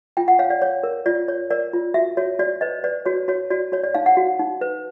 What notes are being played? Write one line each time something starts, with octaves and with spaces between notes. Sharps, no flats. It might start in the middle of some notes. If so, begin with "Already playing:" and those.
F4 G5
F#5
C#5 F5
D5
C#5
A#4
F4 D5
C#5
A#4 D5
F4
F#4 E5
F#4 C#5
F#4 D5
B4 D#5
B4 D5
F#4 C#5
F#4 C#5
F#4 D5
F#4 C#5
D5
D#4 F5
F#5
F#4
D#4
B4